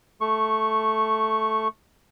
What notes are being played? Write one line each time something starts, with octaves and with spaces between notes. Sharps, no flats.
A3 C#6